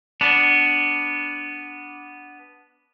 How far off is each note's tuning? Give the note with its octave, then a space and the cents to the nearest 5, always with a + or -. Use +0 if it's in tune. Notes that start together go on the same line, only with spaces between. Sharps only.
B3 +0 D4 -5